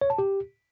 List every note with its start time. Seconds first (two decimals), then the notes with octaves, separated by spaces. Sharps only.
0.01 C#5
0.10 A5
0.19 G4